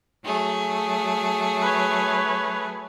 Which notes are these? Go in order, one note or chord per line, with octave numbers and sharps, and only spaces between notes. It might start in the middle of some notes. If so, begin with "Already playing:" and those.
F#3 A3 G#4
B4 C#5